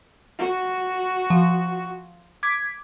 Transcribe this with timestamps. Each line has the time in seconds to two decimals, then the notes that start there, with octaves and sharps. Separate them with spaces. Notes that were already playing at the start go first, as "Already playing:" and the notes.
0.38 F#4
1.30 F3
2.43 D6 G#6 B6